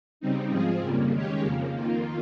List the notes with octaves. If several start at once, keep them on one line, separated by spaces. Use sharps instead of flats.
C#3 G3 C4 D#4
G#2 F3 C4 F4 G#4
F2 C#3 G3 A#3
D#3 G#3 C#4 G4 C#5
F2 C#3 F3 A#3
F2 D#3 A#3 F4